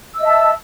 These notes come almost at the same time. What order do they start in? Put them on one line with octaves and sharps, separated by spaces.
E6 D#5 E5 A5